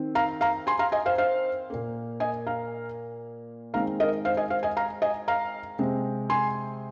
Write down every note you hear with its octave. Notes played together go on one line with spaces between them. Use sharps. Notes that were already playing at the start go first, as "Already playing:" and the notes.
Already playing: D#3 C4
F5 A#5
F5 A#5
G#5 C6
F5 A#5
D#5 G#5
C5 F5
C5 F5
A#2 A#3
D#5 G#5
F5 A#5
D#3 G#3 C4 F5 A#5
A#4 D#5
C5 F5
D#5 G#5
C5 F5
D#5 G#5
F5 A#5
D#5 G#5
F5 A#5
C3 G#3 C4
G#5 C6